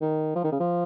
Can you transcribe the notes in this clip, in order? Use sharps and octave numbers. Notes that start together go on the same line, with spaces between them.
D#3
F3
D#3
C#3
F3